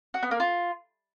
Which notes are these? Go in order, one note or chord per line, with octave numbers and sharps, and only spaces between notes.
F#4
B3
A#3
F4